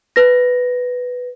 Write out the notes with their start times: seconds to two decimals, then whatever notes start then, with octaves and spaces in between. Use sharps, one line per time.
0.16 B4 A#6